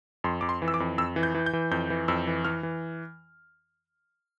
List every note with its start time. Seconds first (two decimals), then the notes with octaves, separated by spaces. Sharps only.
0.24 F2 C6
0.41 F2 D6
0.49 C6
0.62 E3
0.68 E6
0.74 D6
0.80 F2
0.98 F2 E6
1.16 E3
1.23 G6
1.35 E3
1.46 G6
1.53 E3
1.71 F2 G6
1.90 E3
2.08 F2 E6
2.27 E3
2.45 E3 F6
2.63 E3